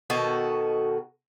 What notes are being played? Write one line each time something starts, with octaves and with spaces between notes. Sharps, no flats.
B2 D#3 F#4 A4